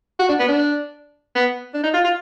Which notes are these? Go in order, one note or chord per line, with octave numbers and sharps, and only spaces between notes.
F#4
D4
B3
D4
B3
D4
D#4
F4
F4